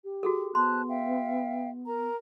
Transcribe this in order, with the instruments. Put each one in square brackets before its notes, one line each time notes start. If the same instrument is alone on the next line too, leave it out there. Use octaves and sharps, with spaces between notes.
[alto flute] G4
[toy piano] F#4 G#4 A4
[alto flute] B3 [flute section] C5 A5 F#6 [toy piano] C6
[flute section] E5 F5 G5
A#4 A#5